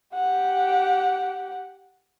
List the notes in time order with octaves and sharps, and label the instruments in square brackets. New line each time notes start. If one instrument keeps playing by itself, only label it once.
[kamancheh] G4 F#5